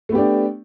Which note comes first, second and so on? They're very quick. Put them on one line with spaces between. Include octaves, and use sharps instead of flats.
A3 B3 G4 D4